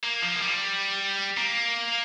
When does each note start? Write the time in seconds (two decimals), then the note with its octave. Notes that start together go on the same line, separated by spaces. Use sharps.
0.04 A#3
0.22 F3
0.35 A#3
0.41 G3
1.37 A#3